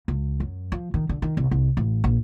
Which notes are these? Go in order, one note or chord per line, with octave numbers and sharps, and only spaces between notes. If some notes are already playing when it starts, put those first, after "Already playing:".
C#2
F#2
F3
D#3
D3
D#3
C2
C2
A1
A#1